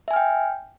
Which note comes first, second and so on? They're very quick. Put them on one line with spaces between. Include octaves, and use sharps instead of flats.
E5 G#5 F6 G5